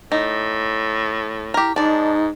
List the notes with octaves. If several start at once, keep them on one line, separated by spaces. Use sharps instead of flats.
A2 D#4
E4 G4 A#4
G#2 D4 D#4 D5